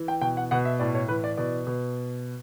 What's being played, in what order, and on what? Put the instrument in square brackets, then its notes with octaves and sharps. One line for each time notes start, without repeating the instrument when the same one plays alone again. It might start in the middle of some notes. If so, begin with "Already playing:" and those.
Already playing: [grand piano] E3
G5
B2 G5
F#5
B2 F#5
E5
A2 D5
C#5
E3 B4
D5
B2 D5
B2